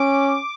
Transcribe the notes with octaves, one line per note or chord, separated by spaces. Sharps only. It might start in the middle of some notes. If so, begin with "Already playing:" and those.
Already playing: C#4 D6